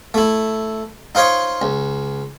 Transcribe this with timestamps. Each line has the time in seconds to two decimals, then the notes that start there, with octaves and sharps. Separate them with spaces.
0.14 A3 E4
1.15 D#4 F4 C5 C#5 D#5
1.62 C#2